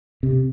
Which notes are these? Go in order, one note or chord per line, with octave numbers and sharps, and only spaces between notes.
C3